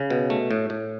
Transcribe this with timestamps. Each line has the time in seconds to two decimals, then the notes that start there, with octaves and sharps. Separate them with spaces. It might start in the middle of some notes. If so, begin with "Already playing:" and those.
Already playing: C#3
0.10 B2
0.30 A3
0.51 A2
0.70 A2